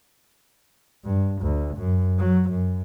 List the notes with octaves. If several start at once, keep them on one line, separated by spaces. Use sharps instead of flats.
G2
D2
F#2
F#3
F#2